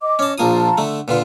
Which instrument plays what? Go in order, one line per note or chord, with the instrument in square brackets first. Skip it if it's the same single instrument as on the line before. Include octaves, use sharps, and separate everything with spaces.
[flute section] D#5 D6
[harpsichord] C#4 A5
[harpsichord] A#1 A#3 D#6 [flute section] F4 A5 A#5
[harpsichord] D3 A3
[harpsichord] A#2 D3 F4 [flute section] B4